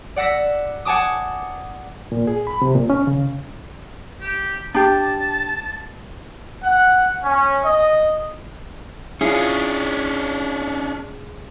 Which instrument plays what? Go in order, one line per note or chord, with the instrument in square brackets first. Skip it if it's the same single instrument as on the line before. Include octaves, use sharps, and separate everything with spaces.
[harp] D5 F#5 E6 A#6 B6
F#5 G#5 A5 D6 D#6
[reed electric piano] A#2
G#4
B5
C3
A#2
C#4
C#3
[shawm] G4
[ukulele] D4 G4 [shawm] A5
[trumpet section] F#5
C#4
D#5
[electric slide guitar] C#4 D4 [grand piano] E4 F4 [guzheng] G#4